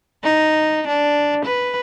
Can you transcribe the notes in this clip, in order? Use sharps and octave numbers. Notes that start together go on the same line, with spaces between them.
D#4
D4
B4